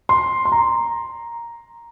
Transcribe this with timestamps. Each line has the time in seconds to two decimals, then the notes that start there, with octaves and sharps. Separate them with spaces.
0.09 C6
0.45 C6
0.52 A#5